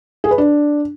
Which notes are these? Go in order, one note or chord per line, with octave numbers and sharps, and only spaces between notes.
G#4
B4
D4